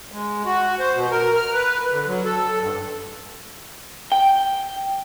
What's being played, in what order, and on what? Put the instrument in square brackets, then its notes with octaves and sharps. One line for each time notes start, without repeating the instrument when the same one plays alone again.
[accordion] G#3
F#4
C5
B2
A#4
F6
B4
D3
F#3
A4
G2
[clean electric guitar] G5